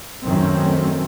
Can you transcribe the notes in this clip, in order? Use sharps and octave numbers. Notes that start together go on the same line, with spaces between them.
F#2 D#3 A3 C4